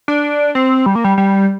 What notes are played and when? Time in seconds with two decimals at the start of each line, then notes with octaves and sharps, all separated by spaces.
0.08 D4
0.55 C4
0.86 G3
0.95 A#3
1.04 G3
1.18 G3